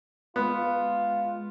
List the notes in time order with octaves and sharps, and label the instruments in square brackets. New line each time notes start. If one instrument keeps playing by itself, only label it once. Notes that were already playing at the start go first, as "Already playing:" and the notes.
[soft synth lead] G#3 [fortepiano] B3 [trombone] F4